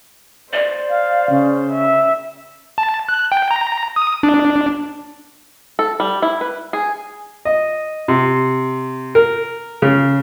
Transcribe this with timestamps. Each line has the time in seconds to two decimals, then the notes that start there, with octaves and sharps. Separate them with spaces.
0.53 C5 D5
0.90 F5
1.30 C#3
1.72 E5
2.78 A5
3.09 F#6
3.32 G5
3.51 A#5
3.96 D#6
4.23 D4
5.79 A4
6.00 G3
6.22 E4
6.41 B4
6.73 G#4
7.45 D#5
8.08 C3
9.15 A#4
9.82 C#3